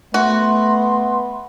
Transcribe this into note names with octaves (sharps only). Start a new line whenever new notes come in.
A3 B3 F#4 C6